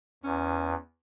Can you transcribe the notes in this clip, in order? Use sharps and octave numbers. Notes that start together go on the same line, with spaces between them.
E2 C#4